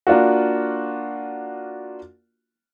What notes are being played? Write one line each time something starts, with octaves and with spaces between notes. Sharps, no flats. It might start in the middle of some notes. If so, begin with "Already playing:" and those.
A#3 D4 F4 F#4